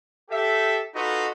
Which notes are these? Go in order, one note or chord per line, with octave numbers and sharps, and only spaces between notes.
G4 A4 E5
D#4 F4 F#4 A4 B4 D#5